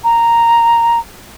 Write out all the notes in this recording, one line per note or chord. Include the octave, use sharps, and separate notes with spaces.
A#5